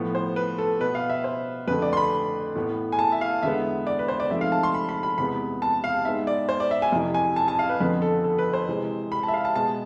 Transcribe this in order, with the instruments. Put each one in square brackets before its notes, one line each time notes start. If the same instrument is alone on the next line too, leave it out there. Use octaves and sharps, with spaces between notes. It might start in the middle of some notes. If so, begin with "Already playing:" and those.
Already playing: [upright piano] A2 F3 B3
C5
B4
A4
B2 B3 B4
F5
E5
C5
F2 D3 A3 B4
D5
C6
B5
A2 E3 B3
G#5
A5
E5
F5
E2 D3 G#3 B3 E5
D5
B4
C5
D5
G#2 F3 A3 C4 E5
F5
A5
C6
B5
B5
B5
E2 C3 G#3 B3 B5
A5
F5
G#2 G#3 B3 E5
D5
C5
D5
E5
G#5
F2 C3 E3
G#5
A5
A5
F5
B4
F2 D3 F3 B3 B4
A4
A4
B4
C5
C3 E3 G#3 C4
B5
A5
E5
F5
A5
B2 G#3 B3 A5